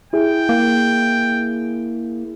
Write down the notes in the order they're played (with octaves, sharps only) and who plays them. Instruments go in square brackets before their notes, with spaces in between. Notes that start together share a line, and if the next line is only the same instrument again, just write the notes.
[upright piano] E4 G#4 [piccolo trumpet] G5
[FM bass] A#3